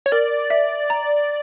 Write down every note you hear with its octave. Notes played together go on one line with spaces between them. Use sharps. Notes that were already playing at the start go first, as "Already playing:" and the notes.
C#5
A#4 D5
E5
A#5